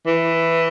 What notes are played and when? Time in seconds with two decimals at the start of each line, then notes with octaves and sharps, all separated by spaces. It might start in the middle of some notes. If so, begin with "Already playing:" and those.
0.07 E3